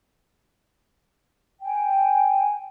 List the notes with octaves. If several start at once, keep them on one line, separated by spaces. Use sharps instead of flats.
G5 G#5